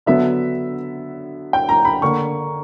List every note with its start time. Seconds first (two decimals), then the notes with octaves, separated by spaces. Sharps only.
0.06 D3 F#3 B3 E5
1.53 G5
1.69 A#5
1.85 B5
2.02 D3 A#3 C#6